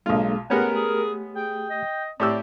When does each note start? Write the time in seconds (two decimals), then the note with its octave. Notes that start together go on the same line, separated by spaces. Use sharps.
0.06 B1 F#3 G#3 A#3 D4 F4 A4
0.50 G#3 A3 B3 C#4 G4 A#4 F#5
0.73 G#4
1.35 G#4 G5
1.70 D#5
2.20 A2 C4 G4 D5 E6